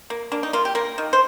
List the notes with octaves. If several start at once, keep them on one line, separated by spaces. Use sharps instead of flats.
A#3
A#3 D4
D#4
A#3 F4
G4
A#3 A#4
D#3
C5